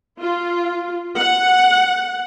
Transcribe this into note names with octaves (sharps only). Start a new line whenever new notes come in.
F4
F#5